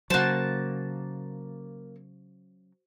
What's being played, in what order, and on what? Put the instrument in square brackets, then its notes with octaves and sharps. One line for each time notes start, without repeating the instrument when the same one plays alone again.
[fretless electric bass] C#3 F#3 [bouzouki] A#3 A5 [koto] F#4 C5